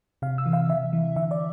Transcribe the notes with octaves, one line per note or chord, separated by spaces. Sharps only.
C3 F5
E6
E3
F5
C3 E5
E3
D3 E5
D5